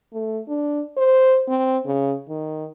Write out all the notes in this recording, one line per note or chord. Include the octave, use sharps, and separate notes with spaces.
A3
D4
C5
C4
C#3
D#3